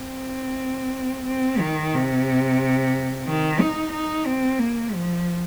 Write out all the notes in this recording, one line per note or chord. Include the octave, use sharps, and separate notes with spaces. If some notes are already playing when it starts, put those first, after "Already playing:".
Already playing: C4
C4
D#3
C3
D#3
D#4
D#4
C4
A#3
F3